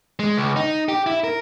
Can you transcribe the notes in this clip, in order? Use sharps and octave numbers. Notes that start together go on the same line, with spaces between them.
G#3
C#2
D#4
G4
E4
A#4